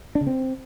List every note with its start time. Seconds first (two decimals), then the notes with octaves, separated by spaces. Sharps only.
0.15 D4
0.21 C#3
0.27 C4